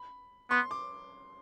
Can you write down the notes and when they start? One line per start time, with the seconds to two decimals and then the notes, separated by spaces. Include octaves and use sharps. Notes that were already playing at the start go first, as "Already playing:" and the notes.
Already playing: B5
0.50 B3 C6
0.71 D6